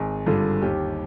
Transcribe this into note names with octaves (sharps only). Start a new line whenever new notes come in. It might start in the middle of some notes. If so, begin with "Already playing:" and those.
Already playing: G#1 G#4
G2 D3 F4
D#2 G4